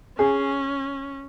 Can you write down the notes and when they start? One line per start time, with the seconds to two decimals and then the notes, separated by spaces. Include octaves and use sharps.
0.18 C#4 G#4